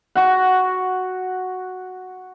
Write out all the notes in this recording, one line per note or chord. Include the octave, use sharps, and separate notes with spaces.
F#4 F#5